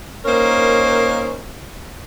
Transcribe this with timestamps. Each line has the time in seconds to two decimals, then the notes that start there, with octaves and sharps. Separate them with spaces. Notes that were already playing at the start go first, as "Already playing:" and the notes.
0.25 A#3 C#4 D#4 A#4 C5